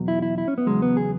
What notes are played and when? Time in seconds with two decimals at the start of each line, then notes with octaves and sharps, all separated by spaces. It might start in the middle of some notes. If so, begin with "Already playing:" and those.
Already playing: E2 B2 F#3
0.08 E4
0.22 E4
0.38 E4
0.48 C#4
0.58 B3
0.67 E2 C#3 F#3 G#3
0.82 B3
0.97 G#4